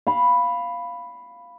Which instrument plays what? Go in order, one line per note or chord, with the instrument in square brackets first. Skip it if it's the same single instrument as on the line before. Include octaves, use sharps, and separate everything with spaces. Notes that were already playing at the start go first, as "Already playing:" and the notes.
[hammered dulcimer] F5 B5